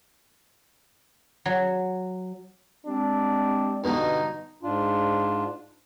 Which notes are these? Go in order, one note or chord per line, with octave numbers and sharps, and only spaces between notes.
F#3
G3 G#3 C4 D4
G2 B2 D3 D#4
G#2 D4 F4